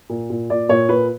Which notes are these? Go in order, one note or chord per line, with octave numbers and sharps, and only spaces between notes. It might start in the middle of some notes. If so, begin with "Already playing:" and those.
A#2
A#2
A#2 D5
A#2 C#5
A#2 B4